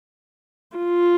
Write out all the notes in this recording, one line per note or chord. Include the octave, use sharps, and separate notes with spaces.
F4